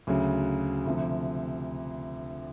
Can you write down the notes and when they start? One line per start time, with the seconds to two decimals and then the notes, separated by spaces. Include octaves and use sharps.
0.07 D2 C#3 F#3
0.86 D2 C3 F3